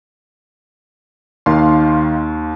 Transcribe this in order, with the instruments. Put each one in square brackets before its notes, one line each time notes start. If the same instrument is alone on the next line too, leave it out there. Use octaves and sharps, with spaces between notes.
[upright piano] D#2 [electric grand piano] D#3 F5 C6